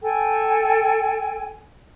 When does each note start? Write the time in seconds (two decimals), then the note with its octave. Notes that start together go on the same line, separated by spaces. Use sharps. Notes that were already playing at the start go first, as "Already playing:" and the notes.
0.03 A4 G5 G#5